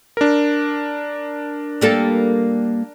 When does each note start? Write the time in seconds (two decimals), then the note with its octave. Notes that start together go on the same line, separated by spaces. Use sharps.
0.17 D4 A#4
1.81 G3 A#3 A4